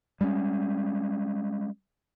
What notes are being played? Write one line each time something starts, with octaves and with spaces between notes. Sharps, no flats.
G3 G#3 A#3 C#4